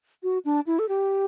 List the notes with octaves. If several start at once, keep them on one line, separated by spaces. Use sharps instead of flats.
F#4
D4
E4
A4
G4